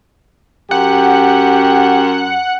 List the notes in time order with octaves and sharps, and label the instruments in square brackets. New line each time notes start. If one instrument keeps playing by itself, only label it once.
[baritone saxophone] F#2 [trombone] G4 [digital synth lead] F#5